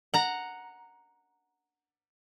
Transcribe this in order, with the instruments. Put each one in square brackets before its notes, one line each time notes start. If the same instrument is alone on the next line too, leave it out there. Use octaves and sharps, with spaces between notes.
[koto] F#5 A#5